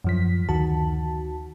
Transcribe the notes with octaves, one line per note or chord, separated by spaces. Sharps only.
F#2 F3 B6
D2 D#3 F#4 A5